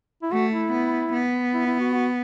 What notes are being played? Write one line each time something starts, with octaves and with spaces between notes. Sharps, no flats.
E4
A3 F#4
E4
B3
B3
E4
E4
F#4
F#4